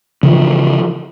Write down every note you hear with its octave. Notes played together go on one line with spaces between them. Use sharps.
C#3 E3 F3